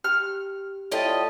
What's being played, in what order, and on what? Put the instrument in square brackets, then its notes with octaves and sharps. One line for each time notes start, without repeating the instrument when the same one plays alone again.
[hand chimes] G4 [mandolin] F6
[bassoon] A2 [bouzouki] F4 G4 D#5 [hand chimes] D5 A5 A6